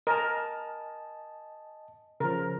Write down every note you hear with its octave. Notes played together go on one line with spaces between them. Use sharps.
A#4 D#5 G#5 A5
C#3 F3 A#4